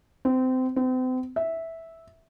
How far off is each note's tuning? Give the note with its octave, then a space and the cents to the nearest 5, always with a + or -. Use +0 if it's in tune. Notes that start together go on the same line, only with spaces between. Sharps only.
C4 -25
C4 -40
E5 -10